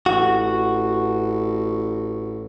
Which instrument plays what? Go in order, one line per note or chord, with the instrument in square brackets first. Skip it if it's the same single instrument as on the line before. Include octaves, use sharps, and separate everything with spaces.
[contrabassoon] A1 [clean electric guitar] F#4